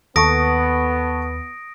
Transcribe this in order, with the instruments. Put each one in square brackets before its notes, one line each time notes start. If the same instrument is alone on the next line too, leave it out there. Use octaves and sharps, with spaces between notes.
[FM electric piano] D#2 [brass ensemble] B3 [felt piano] A4 A5 C#6 [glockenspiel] D#6 A#6 D7